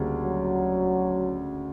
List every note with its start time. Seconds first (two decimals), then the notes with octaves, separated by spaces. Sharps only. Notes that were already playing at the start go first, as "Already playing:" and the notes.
Already playing: D2 C#3 G3 A#3
0.24 F#3